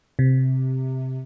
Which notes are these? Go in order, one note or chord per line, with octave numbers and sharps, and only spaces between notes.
C3